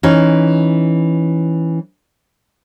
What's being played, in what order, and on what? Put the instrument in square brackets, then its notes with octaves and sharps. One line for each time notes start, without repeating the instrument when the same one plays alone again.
[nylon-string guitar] E3 C#4 D#4